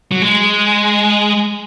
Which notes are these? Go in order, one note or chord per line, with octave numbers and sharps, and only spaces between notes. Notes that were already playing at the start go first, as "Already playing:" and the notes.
F#3
G#3